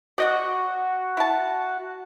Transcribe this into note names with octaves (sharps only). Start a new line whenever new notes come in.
F#4 D5 D#5 F#5
E4 A5